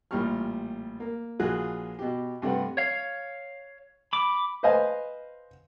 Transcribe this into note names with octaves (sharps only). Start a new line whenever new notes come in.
A1 A#2 G3 G4 C#6 F6
A#3
A#1 F4 F#4 G#4 G#5 F#6
B2 G4
G2 C3 A3 B4 F#5
C#5 F5
B5 D6
B4 C5 D#5 F5 G#5